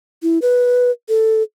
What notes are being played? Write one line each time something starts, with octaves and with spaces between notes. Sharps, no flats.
E4
B4
A4